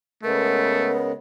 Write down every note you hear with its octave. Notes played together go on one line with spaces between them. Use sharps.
C#3 G#3 A3 B3 A#4